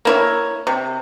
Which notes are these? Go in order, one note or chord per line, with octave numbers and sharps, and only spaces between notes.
A#3 E4 C#5
C3